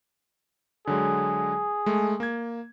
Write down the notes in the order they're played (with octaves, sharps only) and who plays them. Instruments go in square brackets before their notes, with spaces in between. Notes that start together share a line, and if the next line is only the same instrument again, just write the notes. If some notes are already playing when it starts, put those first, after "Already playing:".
[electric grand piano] D3 F#3 G#3 [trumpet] G#4
[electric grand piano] G#3 A3
A#3 G#6